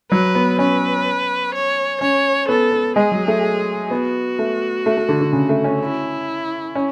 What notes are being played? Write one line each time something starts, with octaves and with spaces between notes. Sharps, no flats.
F#3 B4
B3
C#4 B4
C#5
C#4 C#5
B3 A4
B3
G#3 G#4
F#3
A3
B3 F#4
A3
A3
A3
D3
D3
C#3
A3
C#4
E4
C#4